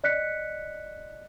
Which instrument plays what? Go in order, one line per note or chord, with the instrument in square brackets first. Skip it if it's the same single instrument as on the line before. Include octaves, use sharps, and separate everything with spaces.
[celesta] D5 D#5 F#6 B6 C#7